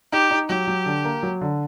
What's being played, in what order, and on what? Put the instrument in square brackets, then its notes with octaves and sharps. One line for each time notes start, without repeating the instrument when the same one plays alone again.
[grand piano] D#4 [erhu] G4
[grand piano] D#4
[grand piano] F#3 [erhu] G4
[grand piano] F#3
D3
A#3
F#3
D3